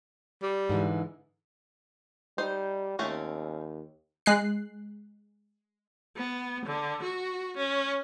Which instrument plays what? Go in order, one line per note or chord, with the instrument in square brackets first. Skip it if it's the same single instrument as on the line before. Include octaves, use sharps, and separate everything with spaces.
[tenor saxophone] G3
[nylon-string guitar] G#2 D3 E3
[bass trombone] G3 [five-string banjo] D#4 C5
[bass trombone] D#2 [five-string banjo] A3 C4 C#4
[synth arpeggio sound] G#3 F#6 C7
[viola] B3
D3
F#4
C#4